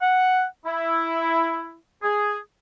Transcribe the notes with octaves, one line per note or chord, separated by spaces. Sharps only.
F#5
E4
G#4